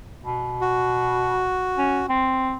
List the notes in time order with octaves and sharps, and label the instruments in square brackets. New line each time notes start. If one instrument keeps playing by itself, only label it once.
[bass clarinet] B2
[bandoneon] F#4
[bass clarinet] C#4
C4